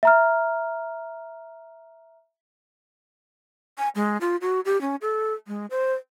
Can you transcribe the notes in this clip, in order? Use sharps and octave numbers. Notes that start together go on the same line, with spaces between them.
E5 A#5 F6
G#5
G#3
F4
F#4
G4
C#4
A4
G#3
C5